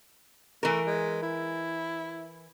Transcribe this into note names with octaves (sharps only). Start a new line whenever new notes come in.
E3 A3 A#4
G#3
E4